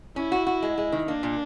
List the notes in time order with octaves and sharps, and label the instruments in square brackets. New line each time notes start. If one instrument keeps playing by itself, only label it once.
[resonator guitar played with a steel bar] C#4 [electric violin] E4
[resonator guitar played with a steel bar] F#4
F#4
G#3
G#3
D#3
[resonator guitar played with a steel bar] A#3 [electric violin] D4
[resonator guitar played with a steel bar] A#2